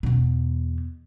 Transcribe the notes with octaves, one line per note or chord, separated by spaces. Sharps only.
E2 B2